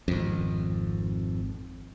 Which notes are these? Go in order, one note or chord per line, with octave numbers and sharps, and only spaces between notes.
G#1 F2